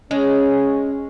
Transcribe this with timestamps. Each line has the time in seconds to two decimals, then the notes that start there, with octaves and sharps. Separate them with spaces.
0.11 G#3 C#4